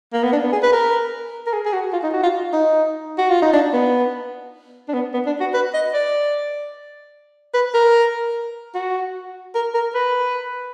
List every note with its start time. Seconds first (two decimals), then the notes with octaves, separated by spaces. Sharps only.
0.13 A#3
0.23 B3
0.32 D4
0.43 B3
0.52 G#4
0.63 B4
0.72 A#4
1.47 A#4
1.53 G#4
1.65 G#4
1.73 F#4
1.93 F4
2.03 D#4
2.13 F#4
2.23 F4
2.53 D#4
3.18 F#4
3.30 F4
3.42 D#4
3.53 D4
3.73 B3
4.88 D4
4.93 B3
5.13 B3
5.26 D4
5.40 F#4
5.54 B4
5.74 D#5
5.94 D5
7.54 B4
7.74 A#4
8.74 F#4
9.55 A#4
9.74 A#4
9.94 B4